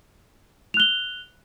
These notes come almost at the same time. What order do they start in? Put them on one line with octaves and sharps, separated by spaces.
F7 F#6 G7